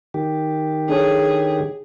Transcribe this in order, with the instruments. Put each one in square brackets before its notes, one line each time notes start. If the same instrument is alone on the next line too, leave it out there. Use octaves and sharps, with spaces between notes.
[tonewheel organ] D#3 G4
[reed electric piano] D4 A4 C#5 [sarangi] G#4